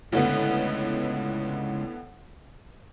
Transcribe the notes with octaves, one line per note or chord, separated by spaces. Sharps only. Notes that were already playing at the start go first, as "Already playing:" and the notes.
C#2 A2 D3 B3